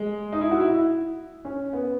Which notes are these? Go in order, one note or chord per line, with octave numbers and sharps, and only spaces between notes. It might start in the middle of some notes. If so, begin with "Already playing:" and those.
Already playing: G#3
D#4
E4
F#4
E4
C#4
B3